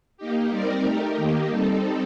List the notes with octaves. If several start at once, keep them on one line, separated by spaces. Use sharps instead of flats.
A#3 D#4 G4
G3 C4 D#4 A#4 D5
A3 D#4 G4 A#4
D#3 A#3 D#4 G4
G3 C4 D#4 A4